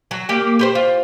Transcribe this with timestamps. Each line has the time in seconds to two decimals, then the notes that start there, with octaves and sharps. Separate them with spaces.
0.11 F#3
0.29 A#3 G4
0.59 G4 B4 C5
0.75 F4